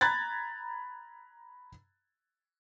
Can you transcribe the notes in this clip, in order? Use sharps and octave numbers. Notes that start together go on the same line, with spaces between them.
A#5 B5 F#6 G#6 A6